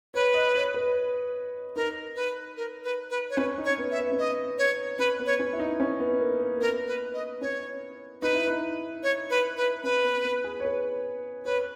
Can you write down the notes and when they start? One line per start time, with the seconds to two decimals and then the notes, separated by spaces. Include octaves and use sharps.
0.14 B4 C#5
0.34 D#5
0.55 C#5
0.74 B4
1.76 D#4 A#4
2.16 B4
2.57 A#4
2.84 B4
3.10 B4
3.30 C#5
3.37 C#4 B4
3.58 D#4
3.65 C#5
3.78 B3
3.91 E5
3.98 B3
4.12 C#4
4.18 B3 D#5
4.58 C#5
4.99 C#4 B4
5.19 B3
5.26 C#5
5.39 C#4
5.53 E4
5.59 D#4
5.80 C#4
6.00 B3
6.20 A#3
6.40 A#3
6.56 A#3
6.61 B3 A#4
6.87 B4
7.14 D#5
7.41 C#4 C#5
8.22 D#4 B4
8.34 E4
8.48 D#4
9.03 C#5
9.30 B4
9.57 B4
9.84 C#4 B4
10.04 B3
10.24 B3
10.44 G#4
10.60 C#5
10.65 B4
11.45 B4 C#5